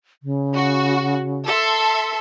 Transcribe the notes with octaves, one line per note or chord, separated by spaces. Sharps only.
C#3
F#4
A4 E5 C6